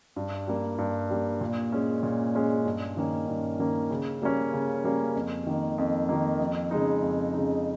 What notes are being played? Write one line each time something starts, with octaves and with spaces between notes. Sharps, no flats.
G2
G3 A#3
G2
G3 A#3
A#2
G#3 C#4
A#2
G#3 C#4
G2
D#3 A#3 C#4
G2
D#3 A#3 C#4
C#3
G3 A#3 C#4
C#3
G3 A#3 C#4
F2
D#3 A#3
F2
D#3 A#3
F2
C#3 G#3 D#4
F2
C#3 G#3 D#4